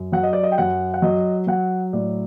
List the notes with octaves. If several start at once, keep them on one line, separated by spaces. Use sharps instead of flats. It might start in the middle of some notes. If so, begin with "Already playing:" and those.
Already playing: F#2
F#3 F#5
D#5
D5
D#5
G5
F#2 F#5
F#5
F#3 D#5
F#3 F#5
A2 D5